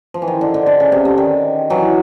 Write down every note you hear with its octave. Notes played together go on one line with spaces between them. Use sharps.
F3
E3
D#3
D3
D3
D3
C#3
C3
D3
D#3
E3 F#3